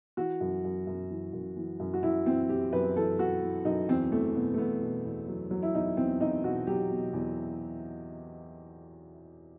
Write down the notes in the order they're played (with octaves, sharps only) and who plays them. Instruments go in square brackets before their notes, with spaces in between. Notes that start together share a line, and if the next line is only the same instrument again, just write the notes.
[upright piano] E3 F#4
F#2
F#2
F#2
E3
F#2
E3
F#2
F#4
F#2 E4
E3 C4
E3 G4
F#2 B4
E3 A4
E3 F#4
E3
F#2 D#4
E2 C4
E2 A3
B2 B3
A3
E2 B3
B2
E2
F#3
F#3
E4
E2 D#4
E2 C4
E2 D#4
B2 F#4
F#3 G4
B2
E2